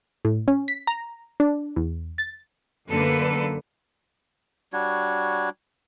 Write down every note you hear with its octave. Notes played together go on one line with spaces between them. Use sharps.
A2
C#4
B6
A#5
D4
E2
A6
F#2 D3 A#3 A4 B4
G3 D4 F#4 C#5